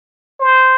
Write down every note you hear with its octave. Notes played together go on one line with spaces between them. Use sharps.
C5